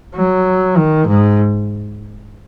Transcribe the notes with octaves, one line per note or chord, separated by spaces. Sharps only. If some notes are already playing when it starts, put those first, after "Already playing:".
F#3
D#3
G#2